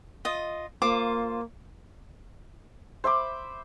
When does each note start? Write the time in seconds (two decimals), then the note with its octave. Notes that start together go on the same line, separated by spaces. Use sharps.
0.25 F4 D#5
0.82 A#3 F4 C5 D6
3.04 C5 E5 B5 D6